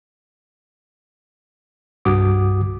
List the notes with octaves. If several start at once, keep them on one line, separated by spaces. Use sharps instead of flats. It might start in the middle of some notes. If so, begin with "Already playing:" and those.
C2 G2 F#4 D6 D#6